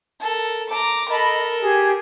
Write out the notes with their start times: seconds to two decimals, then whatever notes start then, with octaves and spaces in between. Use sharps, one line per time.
0.21 A4 A#4
0.69 A#5 D6
1.09 A4 A#4 D#5 B5
1.60 G4 G#4